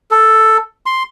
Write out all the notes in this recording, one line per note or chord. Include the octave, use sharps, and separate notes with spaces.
A4
C6